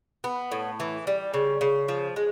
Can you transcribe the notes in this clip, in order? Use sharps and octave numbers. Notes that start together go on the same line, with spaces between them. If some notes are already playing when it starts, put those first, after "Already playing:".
B3
A2
E3
G3
C#3
C#3
F3
G#3